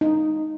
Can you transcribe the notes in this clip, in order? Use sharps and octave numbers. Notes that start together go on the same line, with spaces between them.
D#4